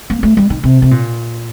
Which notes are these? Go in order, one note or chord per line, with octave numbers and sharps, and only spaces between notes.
A#3
A3
G3
D#3
C3
C3
A#2